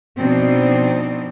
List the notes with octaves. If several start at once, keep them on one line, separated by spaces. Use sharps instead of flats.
B2 F3 C4 D4 D#4